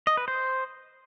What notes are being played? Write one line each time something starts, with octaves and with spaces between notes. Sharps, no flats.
D#5
B4
C5